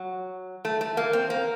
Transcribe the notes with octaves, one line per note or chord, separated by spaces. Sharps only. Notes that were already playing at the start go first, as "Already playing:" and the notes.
Already playing: F#3
A3
A3
A#3
C4
A#3